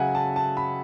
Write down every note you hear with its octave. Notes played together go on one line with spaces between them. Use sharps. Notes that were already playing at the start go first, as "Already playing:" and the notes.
Already playing: C#3 F#3 E5 F#5 G#5
A5
A5
B5